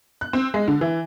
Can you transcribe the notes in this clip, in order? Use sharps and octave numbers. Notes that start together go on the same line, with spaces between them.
F#6
C4
G#3
D3
E3